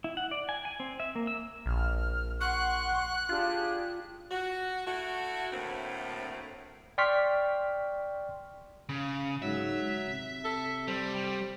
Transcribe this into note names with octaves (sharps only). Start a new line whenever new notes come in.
E4
F#5
D5
G#5
G#5
C4
E5
A#3
E6
A#1 F6
F#5 C6 C#6 F#6
D4 F4 G4 G#4
F#4
A3 E4 F#4
D2 A2 A3 A#3 C4
D5 G5 C6 C#6 F6 B6
C#3
G#2 F#3 E5
C3
A4
G3 C5